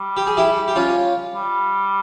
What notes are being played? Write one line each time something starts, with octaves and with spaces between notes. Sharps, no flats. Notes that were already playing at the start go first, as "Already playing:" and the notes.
Already playing: G3
G4
G#4
E4 G4
G4
C#4 F4
G3